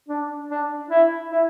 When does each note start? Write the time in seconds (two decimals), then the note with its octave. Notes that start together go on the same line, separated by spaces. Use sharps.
0.09 D4
0.50 D4
0.90 E4
1.31 E4